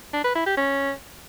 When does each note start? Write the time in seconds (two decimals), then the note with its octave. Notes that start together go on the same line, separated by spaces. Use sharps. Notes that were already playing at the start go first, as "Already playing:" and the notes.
0.13 D4
0.24 B4
0.35 E4
0.46 G4
0.57 C#4